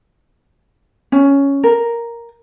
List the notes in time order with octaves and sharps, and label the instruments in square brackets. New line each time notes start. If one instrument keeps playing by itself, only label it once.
[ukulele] C#4
A#4